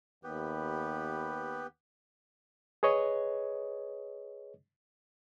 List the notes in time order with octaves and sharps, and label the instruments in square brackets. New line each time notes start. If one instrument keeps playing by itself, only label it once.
[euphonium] D#2 [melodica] B3 G4 B4
[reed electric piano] G#4 B4 C#5 D#5